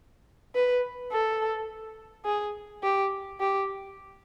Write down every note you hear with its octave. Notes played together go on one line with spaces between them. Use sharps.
B4
A4
G#4
G4
G4